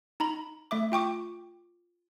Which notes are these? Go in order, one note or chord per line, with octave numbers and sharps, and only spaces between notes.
D#4 A#5 B5
A3 E5 D6
F4 G5 C#6 D6